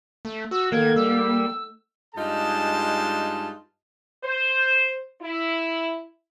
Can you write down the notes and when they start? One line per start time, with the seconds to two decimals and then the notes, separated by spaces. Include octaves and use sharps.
0.25 A3
0.51 F#4 E6
0.72 D#3 A3 A#3 A4 G#6
0.96 G3 E6
2.15 G2 G#3 D#4 F4 G#4 A5
4.24 C5
5.22 E4